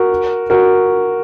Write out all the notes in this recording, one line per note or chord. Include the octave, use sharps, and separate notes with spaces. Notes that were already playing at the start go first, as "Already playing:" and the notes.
Already playing: F#4 A#4
F#4 A#4